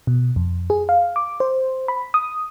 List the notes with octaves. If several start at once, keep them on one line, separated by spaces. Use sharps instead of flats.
B2
F2
G#4
F5
D6
C5
B5
D#6